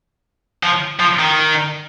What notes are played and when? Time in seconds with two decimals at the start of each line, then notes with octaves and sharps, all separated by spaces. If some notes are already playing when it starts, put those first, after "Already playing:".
0.63 F3
1.00 F3
1.19 D#3